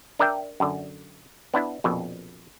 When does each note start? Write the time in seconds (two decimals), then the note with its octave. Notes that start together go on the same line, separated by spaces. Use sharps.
0.19 D4 A#4 D5 E5 G5
0.60 F#2 D3
1.54 B3 D4 E4
1.84 A#1 F2 B2